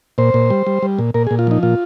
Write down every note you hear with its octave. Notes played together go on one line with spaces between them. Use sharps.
A#2 C5
A#2
G3
G3
G3
A#2
A#2 A#4
G#4
A#2
F4
F3 D#4
A#2 F4